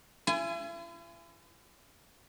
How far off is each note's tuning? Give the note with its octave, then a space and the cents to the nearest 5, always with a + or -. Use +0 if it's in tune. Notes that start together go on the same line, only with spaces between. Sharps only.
E4 +45 G#5 +0